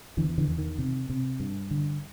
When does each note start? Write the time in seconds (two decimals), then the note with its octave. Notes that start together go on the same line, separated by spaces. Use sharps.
0.17 E2 D3 E3
0.38 D3 E3
0.48 E2
0.58 D#3
0.79 C3
1.10 C3
1.40 G2
1.71 D3